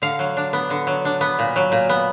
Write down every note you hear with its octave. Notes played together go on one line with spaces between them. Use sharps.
D3 F5
F#3
D4
B3
D3
F#3
D4
B3
A#2
F#3
A#2
B3